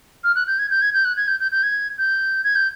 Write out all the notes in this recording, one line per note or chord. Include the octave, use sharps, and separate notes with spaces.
F6
F#6
G6
G#6
G6
G#6
G6
F#6
G#6
G6
G6
G6
G#6
G6
G#6
G6